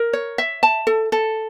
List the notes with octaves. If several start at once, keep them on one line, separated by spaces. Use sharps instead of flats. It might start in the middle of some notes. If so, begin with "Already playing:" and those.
Already playing: A#4
C#5
E5
A5
A4
A4